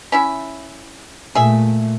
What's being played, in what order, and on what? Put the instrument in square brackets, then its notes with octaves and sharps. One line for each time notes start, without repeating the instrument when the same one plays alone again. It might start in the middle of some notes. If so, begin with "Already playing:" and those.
[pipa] C#4 E4 E5
[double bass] A#2 A3 [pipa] G#4 E5